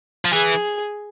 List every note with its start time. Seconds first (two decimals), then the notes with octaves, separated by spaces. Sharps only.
0.25 F3
0.33 E3 G#4